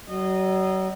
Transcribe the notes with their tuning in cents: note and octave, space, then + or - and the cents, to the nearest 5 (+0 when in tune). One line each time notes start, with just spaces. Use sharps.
F#3 +35 D#5 -20